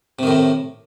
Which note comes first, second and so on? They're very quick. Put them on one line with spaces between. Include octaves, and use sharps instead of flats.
C3 D#3 A2